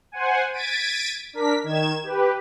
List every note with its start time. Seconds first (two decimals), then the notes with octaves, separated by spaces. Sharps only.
0.12 C5 F#5 G#5
0.52 G#6 A6 B6 D7 D#7
1.33 D4 A#4 B6
1.64 D#3 G#6 E7
2.03 G4 B4